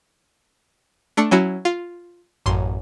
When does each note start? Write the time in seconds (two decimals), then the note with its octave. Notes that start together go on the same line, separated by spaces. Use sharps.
1.17 A3 D4 A4 C#7
1.31 F#3 C#4 E4 F#4
1.65 F4
2.46 A1 F#2 C6